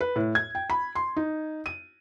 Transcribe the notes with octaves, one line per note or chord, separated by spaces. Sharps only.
B4
A2
G#6
G5
B5
C6
D#4
D#7